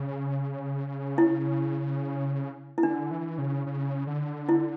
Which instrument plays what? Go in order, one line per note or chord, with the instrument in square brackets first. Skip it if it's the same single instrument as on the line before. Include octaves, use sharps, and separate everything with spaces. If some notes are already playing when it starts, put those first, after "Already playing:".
Already playing: [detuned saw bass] C#3
[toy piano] E4
E4
[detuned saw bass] D3 [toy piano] D4
[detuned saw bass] E3
C#3
C#3
D3
[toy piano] E4